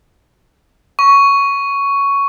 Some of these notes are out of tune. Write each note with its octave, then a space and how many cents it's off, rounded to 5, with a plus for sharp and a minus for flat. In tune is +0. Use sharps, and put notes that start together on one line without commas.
C#6 +10